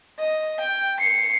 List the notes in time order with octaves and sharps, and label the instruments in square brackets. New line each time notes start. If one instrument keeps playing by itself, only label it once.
[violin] D#5
G5
C7 C#7